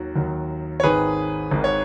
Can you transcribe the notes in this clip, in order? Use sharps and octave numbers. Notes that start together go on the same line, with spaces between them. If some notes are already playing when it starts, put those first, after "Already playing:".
Already playing: D#2 D#3 F#3 F#4
D#2 D#3 F#3
C#5
G#1 G#2 D#3 G#4 B4
G#1 G#2 D#3
C#5